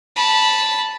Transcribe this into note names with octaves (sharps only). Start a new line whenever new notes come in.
A5 B5